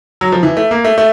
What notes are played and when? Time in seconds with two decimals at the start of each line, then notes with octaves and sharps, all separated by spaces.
0.21 F#3
0.32 F3
0.43 E3
0.57 A3
0.71 A#3
0.84 A3
0.98 A3